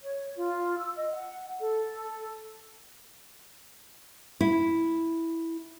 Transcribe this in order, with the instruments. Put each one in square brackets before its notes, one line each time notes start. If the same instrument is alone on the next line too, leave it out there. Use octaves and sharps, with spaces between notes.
[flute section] C#5
F4
E6
D#5
F#5
A4
[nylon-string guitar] E4